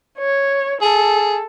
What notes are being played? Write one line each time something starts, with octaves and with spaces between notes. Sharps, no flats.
C#5
G#4 A4